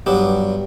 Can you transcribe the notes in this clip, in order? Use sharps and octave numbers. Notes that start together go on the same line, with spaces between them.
G2 F#3 B3 D4 G4